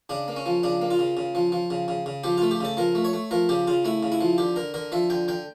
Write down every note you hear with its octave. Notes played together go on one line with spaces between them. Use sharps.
C#3 D4
A#3
C#4
F3
C#3 D4
A#3
F4
C#3
C#3
F3
F3
C#3
C#3
C#3
F3 G4
A3 F4
G4
C#3 A4
F3 A#4
A3
C#5
A3
F3 A#4
C#3 G4
C#3 F4
A3 E4
C#3
E4
F3
D3 G4
D3 A#4
D3 A#4
F3 E5
D3 G5
D3 G5